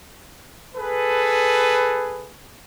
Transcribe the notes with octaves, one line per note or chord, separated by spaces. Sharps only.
G#4 A4 B4